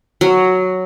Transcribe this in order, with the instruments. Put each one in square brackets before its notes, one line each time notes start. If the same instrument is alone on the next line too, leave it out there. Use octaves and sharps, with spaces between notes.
[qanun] F#3